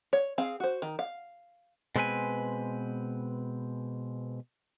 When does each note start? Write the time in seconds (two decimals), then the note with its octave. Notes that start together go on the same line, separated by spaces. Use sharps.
0.13 C#5
0.38 C4 G#4 F5
0.60 F#4 C5
0.82 D#3
0.99 F5
1.96 B2 G#3 C4 B4 G#5